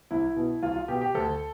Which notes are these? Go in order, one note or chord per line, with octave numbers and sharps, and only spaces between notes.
C2 E4
B2
C2 F4
F4
B2 G4
G4
D2 A4